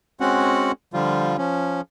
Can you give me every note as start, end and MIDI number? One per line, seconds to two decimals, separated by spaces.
0.20 0.72 56
0.20 0.72 60
0.20 0.72 61
0.20 0.72 66
0.20 0.72 78
0.94 1.37 50
0.94 1.37 53
0.94 1.37 55
0.94 1.37 65
1.38 1.81 53
1.38 1.81 61